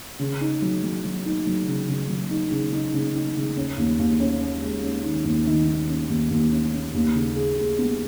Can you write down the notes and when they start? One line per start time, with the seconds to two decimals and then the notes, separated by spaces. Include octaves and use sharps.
0.19 C#3
0.41 D#4
0.62 F#3
0.83 F#3
1.05 F#3
1.26 D#4
1.47 F#3
1.68 C#3
1.88 C#3
2.09 F#3
2.31 D#4
2.52 C#3
2.73 D#4
2.94 C#3
3.15 D#4
3.36 C#3
3.57 C#4
3.78 D#2
3.99 D#2
4.20 C#4
4.41 C#4
4.62 G#3
4.83 C#4
5.04 D#3
5.25 D#2
5.47 D#3
5.67 D#3
5.89 C#4
6.09 D#2
6.30 D#2
6.51 C#4
6.74 C#4
6.94 D#2
7.14 C#3
7.36 G#4
7.58 G#4
7.79 B3